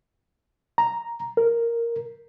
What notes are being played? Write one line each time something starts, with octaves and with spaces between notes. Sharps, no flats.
A#5
A#4